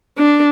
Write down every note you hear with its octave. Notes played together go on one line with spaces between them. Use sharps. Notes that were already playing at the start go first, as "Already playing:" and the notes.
D4